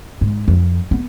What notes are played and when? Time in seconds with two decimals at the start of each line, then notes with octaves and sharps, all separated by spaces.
0.21 G#2
0.48 F2
0.91 B3